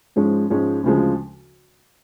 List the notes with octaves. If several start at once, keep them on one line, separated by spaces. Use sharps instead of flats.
G#2 F3 G#3 C#4
G#2 F3 G#3 C#4
D2 C#3 F3 G#3